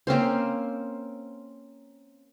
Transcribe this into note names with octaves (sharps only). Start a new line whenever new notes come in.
A#3 C4 C#4 C5